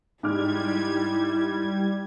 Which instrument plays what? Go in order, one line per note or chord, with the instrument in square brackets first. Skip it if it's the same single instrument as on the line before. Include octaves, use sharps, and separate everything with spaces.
[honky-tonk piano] G#2 D6 F6 [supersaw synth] G3 G#6 [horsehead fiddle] E4